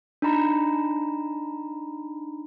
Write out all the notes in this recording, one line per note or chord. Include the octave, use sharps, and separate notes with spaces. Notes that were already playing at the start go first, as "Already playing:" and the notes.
D4 D#4 A#5 B5